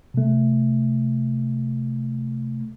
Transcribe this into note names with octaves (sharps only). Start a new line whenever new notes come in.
C3 A3